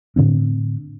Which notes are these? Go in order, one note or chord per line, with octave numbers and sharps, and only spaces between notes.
A2 D3 C4 D4